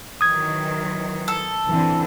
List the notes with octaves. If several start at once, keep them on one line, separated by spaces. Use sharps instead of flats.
D#3 E3 F#3 D#6 G#6
A4
D3 E3 C4